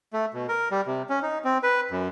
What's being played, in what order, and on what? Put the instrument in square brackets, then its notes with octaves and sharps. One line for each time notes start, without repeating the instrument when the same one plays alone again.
[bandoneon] A3
B2
A#4
G3
C3
C#4
D#4
C4
B4
F#2